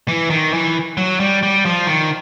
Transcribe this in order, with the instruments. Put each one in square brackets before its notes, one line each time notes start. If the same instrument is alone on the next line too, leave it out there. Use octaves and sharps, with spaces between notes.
[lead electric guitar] E3
D#3
E3
F#3
G3
G3
F3
D#3